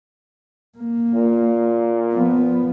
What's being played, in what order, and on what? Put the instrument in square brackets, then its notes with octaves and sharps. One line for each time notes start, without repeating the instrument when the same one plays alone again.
[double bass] A#3
[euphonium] A#2
[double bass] F3 B3